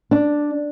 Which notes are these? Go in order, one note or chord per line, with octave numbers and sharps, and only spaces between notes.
D4